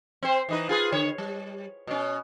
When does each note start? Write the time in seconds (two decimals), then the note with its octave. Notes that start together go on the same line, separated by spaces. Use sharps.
0.23 C4 C5
0.49 E3 D#4 B4
0.69 F4 G#4 B4
0.92 D3 C#5
1.18 G3
1.87 B2 C#4